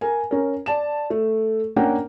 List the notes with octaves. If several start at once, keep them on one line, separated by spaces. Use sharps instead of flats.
A#4 G#5
C#4 A#4
D5 A5 E7
A3
A#3 C#4 D4 A#4 F#5 G5